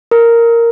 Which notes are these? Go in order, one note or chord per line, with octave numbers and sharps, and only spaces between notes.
A#4